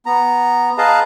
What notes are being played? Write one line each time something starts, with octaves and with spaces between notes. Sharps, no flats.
B3 A#5
G#4 B4 D#5 F5 A5 A#5